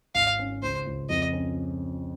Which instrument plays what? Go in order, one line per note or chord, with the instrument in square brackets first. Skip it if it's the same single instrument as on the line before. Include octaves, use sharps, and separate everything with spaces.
[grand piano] G#1 [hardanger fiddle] F5
[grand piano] C#4
[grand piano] C#2 [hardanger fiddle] C5
[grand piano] C#2
[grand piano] F2 [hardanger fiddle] D#5
[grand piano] C#4